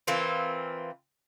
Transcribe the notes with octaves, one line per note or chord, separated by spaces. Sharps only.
E3 A#3 C4 F4